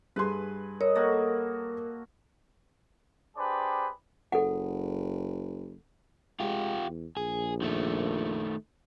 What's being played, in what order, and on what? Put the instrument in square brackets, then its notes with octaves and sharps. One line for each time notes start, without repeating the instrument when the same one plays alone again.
[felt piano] G2 G#4 C6 [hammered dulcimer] B4 G#5
[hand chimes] A#4 [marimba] C#5 [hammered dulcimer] D#5
[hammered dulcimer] A#3 F#4 A4
[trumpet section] D4 G4 G#4 B4 C5 D5
[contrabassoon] F#1 [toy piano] A4 F#5
[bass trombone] G#3 [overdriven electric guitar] F4 G4
[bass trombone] E2
[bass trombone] A#1 [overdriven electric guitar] G#4
[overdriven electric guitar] D#3 A3